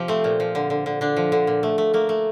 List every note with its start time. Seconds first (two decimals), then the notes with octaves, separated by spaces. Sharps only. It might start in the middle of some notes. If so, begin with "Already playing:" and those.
Already playing: C3 F3 G4
0.08 A3 C4
0.24 A#2
0.40 F3
0.55 D3
0.70 D3
0.86 D3
1.01 D3 D4
1.16 F3
1.32 D3
1.47 A#2
1.63 A3
1.78 A3
1.94 A3 A#3
2.09 A3